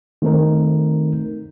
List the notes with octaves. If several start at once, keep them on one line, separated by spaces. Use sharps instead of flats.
D#3 A3 C4 D#4 A#4